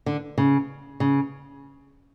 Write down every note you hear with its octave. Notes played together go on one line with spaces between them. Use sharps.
D3
C#3
C#3